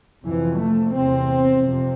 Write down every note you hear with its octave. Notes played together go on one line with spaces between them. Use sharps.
F2 C3 E3
A3
E2 C3 C4
F2 C3